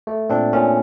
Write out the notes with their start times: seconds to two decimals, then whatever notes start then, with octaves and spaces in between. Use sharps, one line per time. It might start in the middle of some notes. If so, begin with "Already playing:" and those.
0.07 A3
0.29 A#2 C4 D4
0.53 A#2 C#4